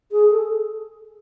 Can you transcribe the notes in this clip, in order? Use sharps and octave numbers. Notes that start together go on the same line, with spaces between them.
G#4
A4